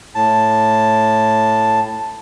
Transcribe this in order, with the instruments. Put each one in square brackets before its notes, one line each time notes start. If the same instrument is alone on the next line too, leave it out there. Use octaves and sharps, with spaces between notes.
[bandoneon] A2 A5